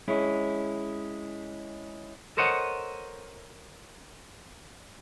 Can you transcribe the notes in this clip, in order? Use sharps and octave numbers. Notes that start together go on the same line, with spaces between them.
G#3 C#4 E4
A4 A#4 C5 C#5 D#5 F#5